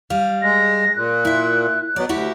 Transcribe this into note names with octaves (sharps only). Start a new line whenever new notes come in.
G3 F5
G#3 A#6
A#2 F#6
E4 E5
B2 F#3 D5
D2 E4 F#4 G4